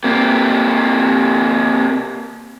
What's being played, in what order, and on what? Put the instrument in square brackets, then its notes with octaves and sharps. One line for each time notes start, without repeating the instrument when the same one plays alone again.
[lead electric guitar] C3 A#3